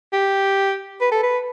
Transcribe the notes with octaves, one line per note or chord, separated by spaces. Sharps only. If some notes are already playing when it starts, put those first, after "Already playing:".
G4
B4
A4
B4